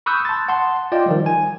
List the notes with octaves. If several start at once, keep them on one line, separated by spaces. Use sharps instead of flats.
B5 C#6 D#6 E6 F#6 G6
A5 C6 A6
F#5 A5 C6
F4 D5 D#5 G5
D#3 F3 G3
G#5